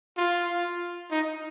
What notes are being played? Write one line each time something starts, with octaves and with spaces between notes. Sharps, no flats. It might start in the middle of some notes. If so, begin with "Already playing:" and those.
F4
D#4